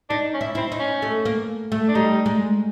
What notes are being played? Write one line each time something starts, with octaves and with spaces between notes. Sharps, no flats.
D4 D#4
C#4
E4
C4 E4
D#4
C#4
A3
A#3
A3
D4
G3 D#4
G#3